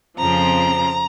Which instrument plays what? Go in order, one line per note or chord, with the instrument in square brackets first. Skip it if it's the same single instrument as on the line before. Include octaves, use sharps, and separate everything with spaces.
[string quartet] F2 C#3 F3 C4 A#5